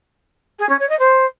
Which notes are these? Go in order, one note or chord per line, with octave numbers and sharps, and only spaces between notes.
G#4
C#4
C#5
D#5
C5